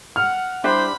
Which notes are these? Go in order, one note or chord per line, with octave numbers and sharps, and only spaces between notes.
F#5 F6
G3 D4 E4 G4 C5 E5 B5